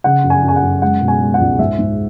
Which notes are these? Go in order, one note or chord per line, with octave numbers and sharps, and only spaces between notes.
C#3 F#5
F#2
G#5
F#2
G#5
F#5
F#2
G#3 F#5
B2
G#5
G#3
F#5
C#2
G#2 E5
G#2